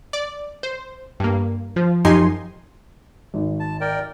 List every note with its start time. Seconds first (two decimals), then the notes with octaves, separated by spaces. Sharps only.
0.13 D5
0.63 C5
1.20 G2 A#3
1.76 F3
2.05 F#2 F3 D#4 G4 G#5 C6
3.34 G#1
3.60 A5
3.81 A#4 D5 G5